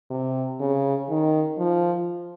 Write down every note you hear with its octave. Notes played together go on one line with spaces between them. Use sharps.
C3
C#3
D#3
F3